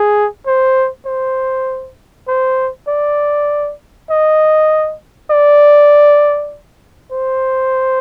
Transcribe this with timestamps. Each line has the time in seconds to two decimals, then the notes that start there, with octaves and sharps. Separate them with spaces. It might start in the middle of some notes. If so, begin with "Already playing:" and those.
Already playing: G#4
0.47 C5
1.06 C5
2.28 C5
2.88 D5
4.10 D#5
5.31 D5
7.12 C5